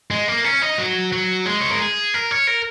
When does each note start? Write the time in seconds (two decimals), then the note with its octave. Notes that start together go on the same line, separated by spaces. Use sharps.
0.11 G#3
0.28 A#3
0.44 C#4
0.62 D#4
0.78 F#3
1.12 F#3
1.46 G#3
1.61 C#5
1.71 A#4
1.80 G#4
2.14 A#4
2.31 C#5
2.47 A#4